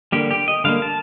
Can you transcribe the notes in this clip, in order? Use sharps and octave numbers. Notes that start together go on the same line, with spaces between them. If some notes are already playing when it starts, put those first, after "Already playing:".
D3 G3 A#3 G4
G4
D#5
D3 G3 A#3 F5
A5